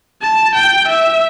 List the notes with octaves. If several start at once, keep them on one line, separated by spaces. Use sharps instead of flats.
A5
G5
E5